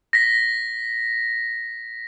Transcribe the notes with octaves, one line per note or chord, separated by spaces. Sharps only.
A#6 B6